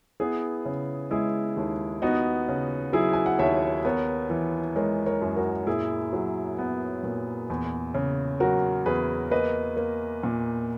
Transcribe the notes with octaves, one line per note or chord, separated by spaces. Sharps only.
B3 E4 G#4
C#3
G#3 E4 G#4
D#2
B3 D#4 F#4
C#3
F#3 E4 G#4
G#5
F#5
D#2 C#5 E5
B3 A#4 C#5
E3
G#3 A#4 C#5
A#4 C#5
F#2
F#4 A#4
A#2 E4 G#4
F#3
B3
A#2
E2
C#3
F#3 F#4 A#4
E2 G#4 B4
A#3 B4 D#5
A#3
A#2